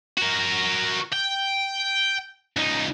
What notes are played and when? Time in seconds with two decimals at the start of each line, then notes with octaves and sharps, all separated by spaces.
0.17 F#4 A#4
1.13 G5
2.57 C#2 D#4